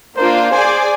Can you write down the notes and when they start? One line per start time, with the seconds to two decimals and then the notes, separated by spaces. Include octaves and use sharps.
0.17 A#3 D4 F4 C5
0.52 G#4 C5 D5 G#5